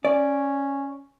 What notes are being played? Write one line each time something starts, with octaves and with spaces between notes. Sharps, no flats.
C#4 D5